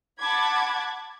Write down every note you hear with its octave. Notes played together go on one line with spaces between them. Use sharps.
F#5 A5 B5 D6 G#6